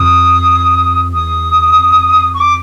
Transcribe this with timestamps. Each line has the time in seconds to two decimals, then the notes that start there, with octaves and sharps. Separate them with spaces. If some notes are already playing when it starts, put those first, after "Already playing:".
Already playing: F2 D#6
1.13 E2 D#6
1.77 F2
2.34 C#6
2.40 D6